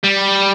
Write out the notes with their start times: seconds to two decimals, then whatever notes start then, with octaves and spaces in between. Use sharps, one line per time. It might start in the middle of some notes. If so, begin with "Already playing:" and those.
0.04 G3